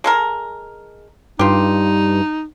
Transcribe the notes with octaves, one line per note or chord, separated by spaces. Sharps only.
G#3 A4 A#4
G2 D#4 F4 G4